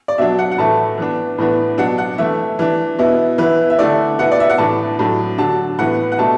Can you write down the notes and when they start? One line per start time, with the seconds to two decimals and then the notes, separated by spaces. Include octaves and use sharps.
0.08 D5
0.18 B2 F#3 D4 E5
0.39 F#5
0.52 F#5
0.58 A2 E3 A3 A5
0.98 E3 B3 D4
1.38 A2 E3 B3 D4
1.78 B2 F#3 D4 F#5
1.98 F#5
2.18 E3 A3 E4 E5
2.59 E3 D4
2.99 B2 B3 E4
3.38 E3 B3 E4 B4
3.70 E5
3.79 D3 A3 E4 D5
4.19 B2 B3 E4 F#5
4.31 D5
4.40 E5
4.50 F#5
4.58 A2 E3 D4 A5
4.99 A2 F#3 D4
5.38 D3 F#3 D4 A5
5.78 A2 E3 B3 F#5
6.12 F#5
6.18 B2 A3 D4 A5